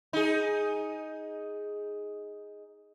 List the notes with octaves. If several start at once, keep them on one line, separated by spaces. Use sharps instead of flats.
D#4 G#4